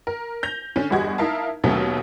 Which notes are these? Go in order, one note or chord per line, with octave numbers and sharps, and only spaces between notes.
A#4
G6 A#6 F7
D3 C#4
G1 E2 G3 F#4 D#5 G#6
D#4 E4 A#4 E5 F5 A5
D#2 B2 F#3 A3 C#4